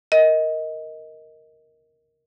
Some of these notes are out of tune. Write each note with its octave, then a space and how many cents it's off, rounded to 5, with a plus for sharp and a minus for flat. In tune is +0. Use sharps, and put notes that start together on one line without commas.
A#4 +0 D#5 +20